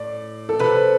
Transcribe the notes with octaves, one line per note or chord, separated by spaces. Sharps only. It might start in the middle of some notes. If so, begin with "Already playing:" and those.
Already playing: A2 D5
A4
C3 B4